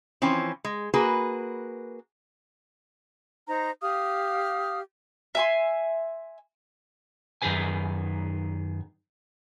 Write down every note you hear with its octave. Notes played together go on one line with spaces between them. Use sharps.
E3 F3 C4 C#4
G#3
A#3 F#4 G#4 B4
D#4 C5 A#5
G4 F5 D#6 F6
E5 G#5 C6
F#2 D#3 D#4 G#4 B4 G#5